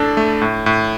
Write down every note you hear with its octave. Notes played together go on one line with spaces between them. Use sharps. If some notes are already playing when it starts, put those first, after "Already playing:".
Already playing: A2 D4 A4
A3
A2
A2